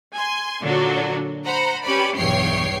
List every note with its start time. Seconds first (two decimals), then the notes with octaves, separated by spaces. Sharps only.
0.14 G#5 C6
0.62 A#2 D3 F#3 D4 F#4
1.45 C5 F#5 A#5 B5
1.84 C#4 G4 B4 D5 B5
2.16 B1 E2 G2 C#5 G5 C7